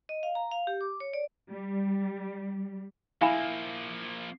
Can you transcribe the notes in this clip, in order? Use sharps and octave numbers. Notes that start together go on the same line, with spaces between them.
D#5
F5
A#5
F5
G4
D6
C#5
D5
G3
F3 A#3 E4 F5 G#5 B5